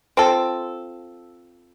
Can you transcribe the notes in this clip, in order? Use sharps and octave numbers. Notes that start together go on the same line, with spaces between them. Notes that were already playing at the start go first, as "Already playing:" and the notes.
C4 F4 A4